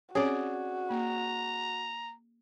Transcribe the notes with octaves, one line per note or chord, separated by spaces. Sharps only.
C4 C#4 F#4 G#4 C#5 D5
A#3 A#5